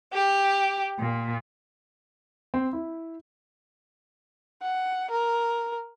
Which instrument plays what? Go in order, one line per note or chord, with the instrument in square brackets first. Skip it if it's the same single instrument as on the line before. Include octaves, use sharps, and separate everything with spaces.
[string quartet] G4
A#2
[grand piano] C4
E4
[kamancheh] F#5
A#4